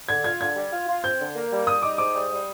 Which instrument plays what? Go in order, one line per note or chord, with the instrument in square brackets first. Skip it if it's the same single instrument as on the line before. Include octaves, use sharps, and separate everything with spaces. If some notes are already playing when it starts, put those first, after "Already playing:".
[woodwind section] D3 [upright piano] G#6
[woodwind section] F4 [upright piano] G#6
[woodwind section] D3 [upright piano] G#6
[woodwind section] G3
F4
F4
[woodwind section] C4 [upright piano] G6
[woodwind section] D3
A#3
G3
[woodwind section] G3 [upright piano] D#6
[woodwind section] D#4 [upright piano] D6
[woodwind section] G#2 [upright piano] D6
[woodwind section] G3
G3